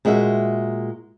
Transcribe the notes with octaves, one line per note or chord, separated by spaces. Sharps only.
A#2 G#3 F#4 A#4 E5